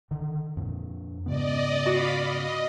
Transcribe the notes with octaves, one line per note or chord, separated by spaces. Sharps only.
D3 D#3
F2 A#2
G#2 C#3 B3 D5 D#5
F#4 D5 F5 B5
D#5